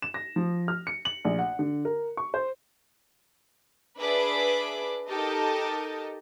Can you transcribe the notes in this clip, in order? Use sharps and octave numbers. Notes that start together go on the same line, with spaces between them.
E7
A#6
F3
F6
C#7
F#7
A#1
F#5
D3
A#4
C#6
C5
D4 G#4 B4 E5 B5 D6
D#4 G4 A4 A#4 D#5 A5